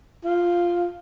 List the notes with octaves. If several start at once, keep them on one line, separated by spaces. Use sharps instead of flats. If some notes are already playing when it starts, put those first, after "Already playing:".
F4